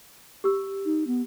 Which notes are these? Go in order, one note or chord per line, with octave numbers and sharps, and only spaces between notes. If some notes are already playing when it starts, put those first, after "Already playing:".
G4 E6
D#4
B3